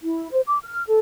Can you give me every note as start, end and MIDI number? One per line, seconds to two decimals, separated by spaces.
0.03 0.28 64
0.31 0.41 72
0.46 0.57 86
0.64 0.83 89
0.87 0.98 69